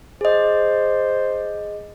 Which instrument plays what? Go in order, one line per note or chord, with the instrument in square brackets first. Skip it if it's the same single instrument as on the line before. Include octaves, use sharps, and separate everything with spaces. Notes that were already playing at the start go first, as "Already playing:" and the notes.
[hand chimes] G#4 D#5 [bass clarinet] C5